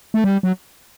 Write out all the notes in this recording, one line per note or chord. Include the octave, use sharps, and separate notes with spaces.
A3
G3
F#3